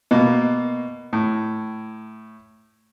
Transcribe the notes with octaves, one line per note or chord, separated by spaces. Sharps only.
B2 A#3
A2